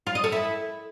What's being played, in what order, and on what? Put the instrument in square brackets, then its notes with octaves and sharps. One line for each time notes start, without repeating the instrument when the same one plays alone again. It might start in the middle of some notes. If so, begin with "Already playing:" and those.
[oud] F4
D#5
A4
E4